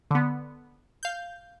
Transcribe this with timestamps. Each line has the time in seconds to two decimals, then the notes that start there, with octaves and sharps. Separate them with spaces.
0.11 D3 B3
1.03 F5 G6